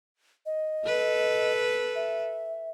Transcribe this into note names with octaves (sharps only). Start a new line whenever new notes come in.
D#5
A4 B4
E5